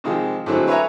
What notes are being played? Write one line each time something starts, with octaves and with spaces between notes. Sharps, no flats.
C3 D#3 F3 G#3
A2 D3 F#3 G#3 C4
B4 C#5 E5 G#5 A#5